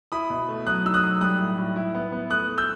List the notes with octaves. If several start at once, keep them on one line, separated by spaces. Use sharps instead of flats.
E4 B5 D#6
B2
A3
F#3 D#6 F#6
D#4 E6
D#6 F#6
F#3
G3 D#6 F#6
A2
A2
E4
B3
B3
A3 D#6 F#6
A3
E6 G6